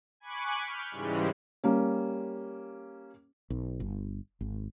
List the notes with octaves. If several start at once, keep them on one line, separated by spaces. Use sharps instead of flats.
G#5 B5 C#6 D6 F#6
F6 G6 B6
G#2 C#3 E3 G3 G#3
G3 A#3 C#4
B1
G1
G#1